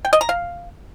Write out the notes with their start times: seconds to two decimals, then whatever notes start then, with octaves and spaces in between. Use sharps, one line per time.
0.05 G5
0.13 D#5
0.21 A#5
0.29 F5